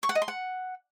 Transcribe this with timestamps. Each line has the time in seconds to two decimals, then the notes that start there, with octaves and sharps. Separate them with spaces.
0.03 C#6
0.09 F#5
0.15 D#5
0.22 C6
0.28 F#5